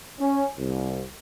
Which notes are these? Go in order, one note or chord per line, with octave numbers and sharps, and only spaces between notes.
C#4
C2